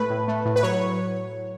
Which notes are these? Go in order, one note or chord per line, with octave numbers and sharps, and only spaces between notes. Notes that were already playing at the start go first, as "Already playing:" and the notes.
Already playing: A2 A3 B4
A2
A3
A2
B4
F#3 C#5